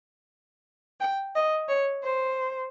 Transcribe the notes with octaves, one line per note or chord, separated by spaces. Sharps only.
G5
D#5
C#5
C5